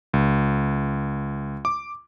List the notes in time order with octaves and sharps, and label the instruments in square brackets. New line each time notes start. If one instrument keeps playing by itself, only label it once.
[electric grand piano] C#2
D6